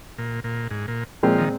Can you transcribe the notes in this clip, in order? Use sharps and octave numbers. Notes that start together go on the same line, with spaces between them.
A#2
A#2
G#2
A#2
A#2 F3 G#3 C4
D#3